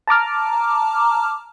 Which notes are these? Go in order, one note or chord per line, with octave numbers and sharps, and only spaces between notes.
A5 A#5 D6 F6